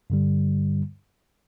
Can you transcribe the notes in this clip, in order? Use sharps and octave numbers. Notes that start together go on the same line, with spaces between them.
G2 D3 G3